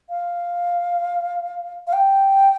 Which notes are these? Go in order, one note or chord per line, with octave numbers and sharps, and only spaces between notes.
F5
F5
G5